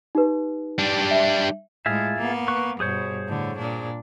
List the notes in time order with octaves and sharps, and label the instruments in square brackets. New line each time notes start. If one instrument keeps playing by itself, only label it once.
[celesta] D#4 G4 B4
[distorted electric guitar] G3 D4
[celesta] E5
[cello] A2 G#3 [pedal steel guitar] F4 G#4 E5
[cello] A#3 B3
[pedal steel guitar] B4 C#6
[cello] G2 B2 [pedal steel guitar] G#4 C5 C#5
[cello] A2 D3
A#2 D4